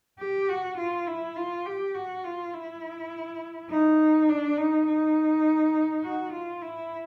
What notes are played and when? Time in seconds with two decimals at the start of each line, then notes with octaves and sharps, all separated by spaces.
0.19 G4
0.49 F#4
0.78 F4
1.07 E4
1.36 F4
1.66 G4
1.95 F#4
2.24 F4
2.53 E4
3.70 D#4
4.29 D4
4.58 D#4
4.87 D#4
6.04 F#4
6.33 F4
6.62 E4